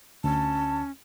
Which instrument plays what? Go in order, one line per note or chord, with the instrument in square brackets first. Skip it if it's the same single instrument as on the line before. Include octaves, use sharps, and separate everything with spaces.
[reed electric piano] D2 [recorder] C#4 [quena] A5